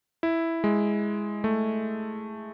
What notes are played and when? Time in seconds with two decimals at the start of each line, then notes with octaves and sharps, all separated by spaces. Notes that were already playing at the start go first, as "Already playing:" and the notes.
0.23 E4
0.64 G#3
1.44 A3